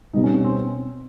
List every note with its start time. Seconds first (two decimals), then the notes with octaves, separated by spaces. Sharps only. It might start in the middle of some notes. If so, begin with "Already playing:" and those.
0.13 B2 G3 D#4
0.24 C#4
0.35 C#4
0.44 C4